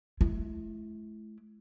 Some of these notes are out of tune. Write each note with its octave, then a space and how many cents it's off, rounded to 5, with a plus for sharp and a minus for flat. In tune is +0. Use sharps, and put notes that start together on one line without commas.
A3 -40 E4 +20